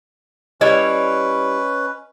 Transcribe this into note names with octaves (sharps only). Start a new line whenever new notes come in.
G3 C#4 E4 B4 C#5 D#5